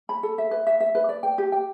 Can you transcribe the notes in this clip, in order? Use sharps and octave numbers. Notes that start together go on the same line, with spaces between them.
B5
A4
E5
B4
E5
E5
B4
D5
G5
G4
G5